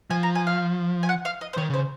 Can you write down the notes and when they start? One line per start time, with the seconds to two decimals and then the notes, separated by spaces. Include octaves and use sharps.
0.10 F3 G#5
0.23 A#5
0.35 G#5
0.47 F5
1.03 G#5
1.09 F#5
1.25 F5
1.41 D#5
1.53 C5
1.57 D#3 C#5
1.70 C#3 C5